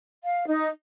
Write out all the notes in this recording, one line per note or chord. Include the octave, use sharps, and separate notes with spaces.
F5
D#4